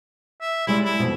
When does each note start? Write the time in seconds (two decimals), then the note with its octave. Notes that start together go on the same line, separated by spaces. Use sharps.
0.41 E5
0.67 G3 G#3 E4 D5
0.85 E4
0.99 F2 B2